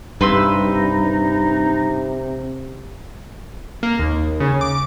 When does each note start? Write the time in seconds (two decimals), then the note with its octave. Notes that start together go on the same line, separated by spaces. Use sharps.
0.21 G2 C3 D#4 B4 C6 E6
3.83 A#3
3.99 D#2
4.40 C#3
4.61 D6